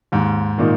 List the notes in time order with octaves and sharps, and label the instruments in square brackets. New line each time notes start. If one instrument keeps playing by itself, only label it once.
[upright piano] D#2 [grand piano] G#2
[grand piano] A#2 [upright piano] D#3 A#3 D#4